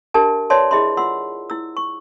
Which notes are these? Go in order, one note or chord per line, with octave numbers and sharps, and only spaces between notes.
D4 G4 A#4 E5 A5
B4 C#5 D5 E5 A5 C6
E4 G#4 D#5 E5 B5 C6
F4 F#5 C6 E6
E4 E6
C#6